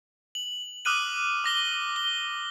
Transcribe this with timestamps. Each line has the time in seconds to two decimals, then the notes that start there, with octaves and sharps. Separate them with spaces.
0.35 F#7
0.85 D6 D#6 F6 F#6 D#7 F#7
1.44 D6 A#6 G7
1.96 G7